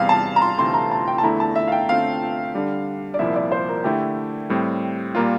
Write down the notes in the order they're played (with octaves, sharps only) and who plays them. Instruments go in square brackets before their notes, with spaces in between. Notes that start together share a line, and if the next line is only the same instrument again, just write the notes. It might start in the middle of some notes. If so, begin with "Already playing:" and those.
Already playing: [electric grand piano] E2 C3 G3 [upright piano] F5
[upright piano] A5
A#5
C6
[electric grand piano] D2 C3 E3 A3 C4 [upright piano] C6
[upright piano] A#5
A5
G5
A5
[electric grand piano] E2 D3 A3 E4 [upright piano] A#5
[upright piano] A5
E5
F5
G5
[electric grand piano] D3 A3 C4 F4 [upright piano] F5
[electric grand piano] D3 G3 D4
[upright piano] D5
[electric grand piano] C2 A#2 F3 A#3 E4 [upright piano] E5
[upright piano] D5
C5
A#4
[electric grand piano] D3 A3 E4 [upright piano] G4
[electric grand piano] A2 G3 C4
[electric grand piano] A#2 G3 A#3 F4 [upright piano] A#4